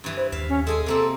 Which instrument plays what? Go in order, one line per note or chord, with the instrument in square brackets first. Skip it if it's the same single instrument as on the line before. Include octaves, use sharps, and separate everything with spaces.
[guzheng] G2 E3
[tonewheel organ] C5
[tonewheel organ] D#2 [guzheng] E5 F5
[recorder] C#4
[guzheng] G#3 G#4 G#5 [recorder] A4
[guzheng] C3 A#3 C4 [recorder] A4